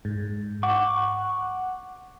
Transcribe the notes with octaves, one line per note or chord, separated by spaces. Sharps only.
G#2
F#5 C#6 D6